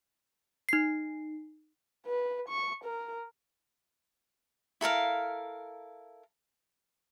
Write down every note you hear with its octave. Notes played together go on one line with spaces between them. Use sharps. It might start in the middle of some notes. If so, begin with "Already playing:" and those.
D#4 C7
B4
C#6
A#4
E4 A4 A#4 F5